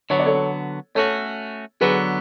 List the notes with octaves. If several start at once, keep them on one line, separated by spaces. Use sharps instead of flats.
D3 F#3 B3 C#5
D5
A4 C#5
A3 C#4 F#4 A4 C#5
D3 F#3 B3 G#4 B4